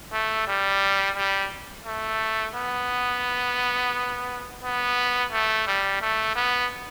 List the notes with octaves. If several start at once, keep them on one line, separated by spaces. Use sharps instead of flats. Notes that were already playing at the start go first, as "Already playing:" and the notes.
A3
G3
G3
A3
B3
B3
A3
G3
A3
B3